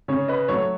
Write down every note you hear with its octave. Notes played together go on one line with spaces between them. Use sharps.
C#3 C#5
B4 D#5
F#3 A3 C#5